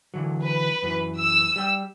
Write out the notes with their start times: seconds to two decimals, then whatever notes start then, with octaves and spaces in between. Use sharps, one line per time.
0.14 D3 E3 F#3
0.43 B4
0.83 F#2 E3
1.18 E6
1.56 G3 G5